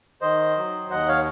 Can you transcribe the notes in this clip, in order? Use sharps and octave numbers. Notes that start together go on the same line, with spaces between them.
D#3 C5 D#5
F#3
D#2 D#5 F#5
C#5 F5